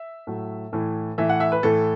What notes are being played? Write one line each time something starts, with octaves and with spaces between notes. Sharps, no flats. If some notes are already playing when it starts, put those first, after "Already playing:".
Already playing: E5
A2 F#3
A2 E3
A2 E3 E5
F#5
E5
B4
A2 E3 A4